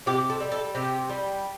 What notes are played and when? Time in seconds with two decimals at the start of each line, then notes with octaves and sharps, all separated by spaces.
0.06 C3 G4
0.30 A4
0.40 G3
0.52 A4
0.75 C3 G4
1.10 G3